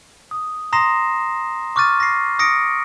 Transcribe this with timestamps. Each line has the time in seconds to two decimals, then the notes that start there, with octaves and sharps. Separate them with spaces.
0.31 D#6
0.73 A#5 C6 D#6 A#6 C7 E7
1.76 C#6 D6 F6 F#6 A6 D#7
2.00 A#6 C7
2.39 D#6 A#6 C#7 D7